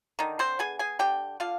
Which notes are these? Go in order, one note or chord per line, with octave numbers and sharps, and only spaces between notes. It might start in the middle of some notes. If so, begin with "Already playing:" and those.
D3 D#3 D#4
C4 C5
B3 G#4 G#5
G#4 G#5
D3 G4 G5
D3 F4 F5